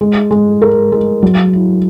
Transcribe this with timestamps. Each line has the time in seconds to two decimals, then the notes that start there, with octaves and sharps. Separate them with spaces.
0.01 G#3
0.31 G#3
0.62 A#4
0.92 G#3
1.23 F#3
1.53 E4